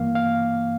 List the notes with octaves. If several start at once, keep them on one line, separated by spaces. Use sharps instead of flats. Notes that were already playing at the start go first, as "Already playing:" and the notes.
Already playing: G2 E3 A#3 F5
F5